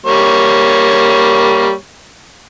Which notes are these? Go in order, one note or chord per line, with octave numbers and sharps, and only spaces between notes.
G3 A#3 C#5